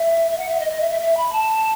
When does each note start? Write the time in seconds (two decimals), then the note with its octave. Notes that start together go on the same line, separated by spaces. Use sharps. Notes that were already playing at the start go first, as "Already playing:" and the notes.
Already playing: E5
0.31 E5
0.38 F#5
0.49 E5
0.60 D#5
0.70 D#5
0.80 E5
0.91 E5
1.01 E5
1.17 B5
1.33 A5